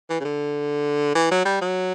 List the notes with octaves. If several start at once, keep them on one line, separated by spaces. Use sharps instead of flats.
E3
C#3
D3
E3
F#3
G3
F#3